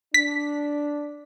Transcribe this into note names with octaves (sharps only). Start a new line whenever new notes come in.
D4 B6